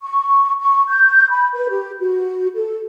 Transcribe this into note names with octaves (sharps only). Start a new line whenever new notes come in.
C#6
C#6
G6
B5
B4
G4
F#4
A4